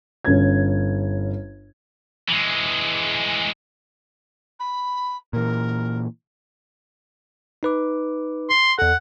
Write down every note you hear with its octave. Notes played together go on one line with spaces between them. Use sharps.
G1 C#4 G#6
E3 G#3
B5
A#2 E3 A#4
D#4 B4 D6
C6
E2 A4 F#5